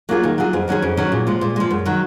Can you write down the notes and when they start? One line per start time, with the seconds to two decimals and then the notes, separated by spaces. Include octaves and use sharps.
0.09 F#3 A#3 F4 G#4
0.23 D#3
0.38 F#3 A#3 F4 G#4
0.53 F2
0.68 D#3 F#3 C#4 G#4
0.82 F2
0.97 D#3 F#3 C#4 G#4
1.12 A#2
1.27 F3 G#3
1.41 A#2
1.56 F3 G#3
1.70 F#2
1.86 D#3 F#3